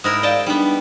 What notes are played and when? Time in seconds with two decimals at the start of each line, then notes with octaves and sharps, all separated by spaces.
0.04 G#2 E4 A#4 D#6 A#6
0.23 D5 D#5 F5 G5 A5
0.46 G3 B3 D4 D#4